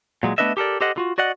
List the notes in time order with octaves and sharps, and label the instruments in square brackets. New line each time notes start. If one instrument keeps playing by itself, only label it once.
[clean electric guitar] A#2 F#3 G#3
A3 B3 D4 B4 D#5 E5
G4 A4 A#4 D5
G4 A4 C5 D#5 F#5
D3 F4 F#4
F#4 D5 D#5 F#5